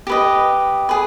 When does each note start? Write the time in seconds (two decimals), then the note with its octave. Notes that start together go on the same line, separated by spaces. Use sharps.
0.07 G4 B4 D#5
0.89 G#4 B4